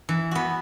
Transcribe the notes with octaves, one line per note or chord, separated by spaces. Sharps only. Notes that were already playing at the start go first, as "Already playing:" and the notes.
E3
B3 F#4